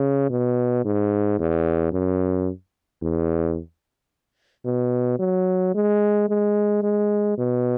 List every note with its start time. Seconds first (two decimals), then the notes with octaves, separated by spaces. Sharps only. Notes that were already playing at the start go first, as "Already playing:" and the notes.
Already playing: C#3
0.30 B2
0.85 G#2
1.39 E2
1.93 F#2
3.02 E2
4.65 B2
5.19 F#3
5.75 G#3
6.29 G#3
6.83 G#3
7.38 B2